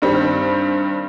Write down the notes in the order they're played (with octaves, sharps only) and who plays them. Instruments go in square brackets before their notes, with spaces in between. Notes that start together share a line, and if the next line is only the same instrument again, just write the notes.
[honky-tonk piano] G2 D#3 G3 C4